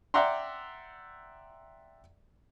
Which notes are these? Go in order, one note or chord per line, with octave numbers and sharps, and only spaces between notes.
D5 E5 F#5 G5 A#5 C6